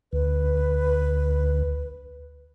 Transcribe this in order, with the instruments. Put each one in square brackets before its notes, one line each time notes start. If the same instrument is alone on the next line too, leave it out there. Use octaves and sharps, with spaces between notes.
[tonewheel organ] D2 [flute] B4